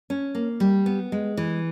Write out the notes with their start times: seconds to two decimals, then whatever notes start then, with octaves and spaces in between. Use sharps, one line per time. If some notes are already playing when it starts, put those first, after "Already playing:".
0.10 C#4
0.35 A#3
0.60 G3
0.86 B3
1.12 G#3
1.37 E3